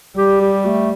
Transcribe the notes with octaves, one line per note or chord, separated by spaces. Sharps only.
G3 G4
G4
A3